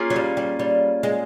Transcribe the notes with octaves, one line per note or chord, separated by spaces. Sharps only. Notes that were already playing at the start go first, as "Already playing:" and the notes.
Already playing: A#3 C#4 F4 G#4
F#3
G3
G3
G3
G#3